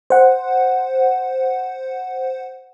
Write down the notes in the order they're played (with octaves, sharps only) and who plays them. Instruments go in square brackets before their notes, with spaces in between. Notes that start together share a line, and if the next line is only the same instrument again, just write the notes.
[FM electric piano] C5 F#5